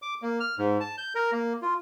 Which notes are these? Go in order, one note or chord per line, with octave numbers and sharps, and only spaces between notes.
D6
A#3
F6
G#2
A5
G6
A#4
A#3
F4